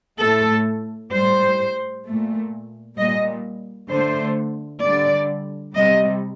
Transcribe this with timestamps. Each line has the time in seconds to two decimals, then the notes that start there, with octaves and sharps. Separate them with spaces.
0.19 A2 A3 A4
1.12 A2 G3 C5
2.05 A#2 A3
2.97 A#2 G3 D#5
3.90 D3 A3 C5
4.83 D3 G3 D5
5.76 C3 G3 D#5